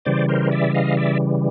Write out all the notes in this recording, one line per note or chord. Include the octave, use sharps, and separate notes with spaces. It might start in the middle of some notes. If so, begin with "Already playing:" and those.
C#3 E3 G3 C5 D5
A#4 C5
D5 E5
D#5 F5
D5 E5